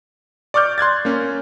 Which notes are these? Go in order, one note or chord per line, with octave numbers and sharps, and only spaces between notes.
D5 C#6 D6 F6 G6
C6 F#6 G#6 A6
A#3 C#4